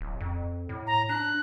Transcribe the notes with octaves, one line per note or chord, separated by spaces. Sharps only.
D1
F2
A2
A#5
D4 F#6